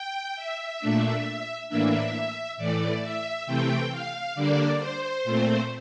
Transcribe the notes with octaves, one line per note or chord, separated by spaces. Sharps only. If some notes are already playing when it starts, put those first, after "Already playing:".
Already playing: G5
E5
A#2 A3 D4
A2 E3 A#3 D4 E5
A2 E3 A3 D5
E5
C3 E3 A3 C4 G5
F5
D3 G3 A#3 D4 D5
C5
A#2 A3 C4